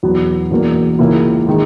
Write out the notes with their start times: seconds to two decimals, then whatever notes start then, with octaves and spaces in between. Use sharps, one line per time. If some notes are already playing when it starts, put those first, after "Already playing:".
0.03 E2 B2 F#3 B3
0.51 E1 E2 B2 A#3
0.99 C#2 C#3 E3 A#3 E4
1.47 D#3 G#3